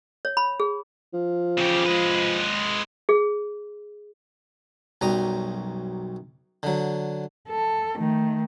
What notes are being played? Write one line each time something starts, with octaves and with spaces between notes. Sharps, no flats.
C#5
B5
G#4
F3
C#3 G4
G#3 B4
G#4
B1 F#2 G3 A#5 D#6
D3 F#3
A4
D#3 A3